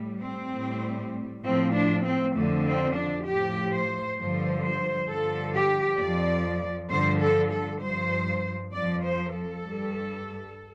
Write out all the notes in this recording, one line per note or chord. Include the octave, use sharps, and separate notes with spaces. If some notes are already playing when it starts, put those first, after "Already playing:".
Already playing: A2 G3
C4
A2 G3
A2 F3 C4
D4
C4
F2 D3 F3 A3
C4
D4
A2 F3 G4
C5
G2 D3 F3 C5
C5
G2 D3 F3 A4
G4
F2 F3 D5
G2 D3 F3 C5
A4
A4
G2 F3 C5
F2 F3 D5
C5
A4
G2 G3